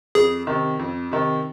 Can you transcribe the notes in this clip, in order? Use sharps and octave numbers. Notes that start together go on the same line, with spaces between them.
F2 G#4
C3 D#3
F2
C3 D#3